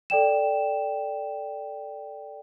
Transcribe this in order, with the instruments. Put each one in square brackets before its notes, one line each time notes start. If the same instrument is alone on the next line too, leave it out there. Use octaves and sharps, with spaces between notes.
[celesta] A4 D5 G5 E7